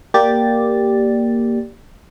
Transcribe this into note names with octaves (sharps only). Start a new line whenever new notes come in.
A#3 G4 D5 A6